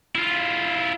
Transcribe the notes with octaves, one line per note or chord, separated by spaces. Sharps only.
E4 F4